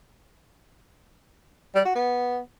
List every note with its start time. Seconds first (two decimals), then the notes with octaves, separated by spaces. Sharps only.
1.75 G3
1.85 F#4
1.95 B3